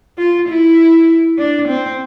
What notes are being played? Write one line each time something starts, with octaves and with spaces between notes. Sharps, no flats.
F4
E4
D4
C4